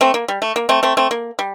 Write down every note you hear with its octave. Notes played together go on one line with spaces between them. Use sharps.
A3 C4
A#3
G3
A3
A#3
A3 C4
A3 C4
A3 C4
A#3
G3